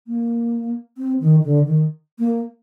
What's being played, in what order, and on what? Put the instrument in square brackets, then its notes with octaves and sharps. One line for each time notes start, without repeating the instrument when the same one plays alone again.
[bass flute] A#3
C4
D#3
D3
D#3
A#3